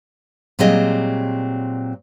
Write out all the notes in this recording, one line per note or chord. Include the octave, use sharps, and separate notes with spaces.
A#2 F#3 G3 C4 G#4 D#5